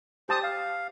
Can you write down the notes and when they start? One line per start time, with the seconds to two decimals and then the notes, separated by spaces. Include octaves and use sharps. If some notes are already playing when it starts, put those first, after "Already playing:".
0.29 G4 C5 A5 D#6
0.43 F5